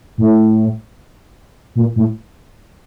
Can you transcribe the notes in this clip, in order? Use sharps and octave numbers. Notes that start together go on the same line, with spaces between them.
A2
A#2
A2